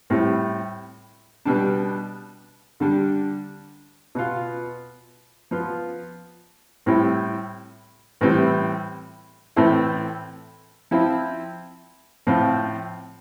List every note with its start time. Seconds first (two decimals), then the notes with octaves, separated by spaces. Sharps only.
0.10 A2 G3 C4 E4
1.45 B2 G3 D4
2.80 D3 G3 D4
4.15 B2 B3 F4
5.51 F3 B3 F4
6.86 A2 G3 C4 E4
8.21 A2 E3 G3 C4 E4
9.56 A2 E3 A3 C4 E4
10.91 F3 C4 E4
12.27 A2 F3 C4